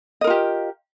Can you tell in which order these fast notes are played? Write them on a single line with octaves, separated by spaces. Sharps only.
D#5 A#4 F4 G4